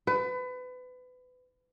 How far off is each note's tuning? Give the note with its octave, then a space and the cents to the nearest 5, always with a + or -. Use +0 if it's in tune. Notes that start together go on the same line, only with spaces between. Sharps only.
B4 +30